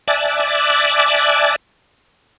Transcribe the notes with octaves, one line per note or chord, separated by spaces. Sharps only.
D5 E5 G#5 A5 D6 F#6